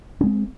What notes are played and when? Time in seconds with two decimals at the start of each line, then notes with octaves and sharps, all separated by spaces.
0.21 C#4
0.24 G#3
0.27 C4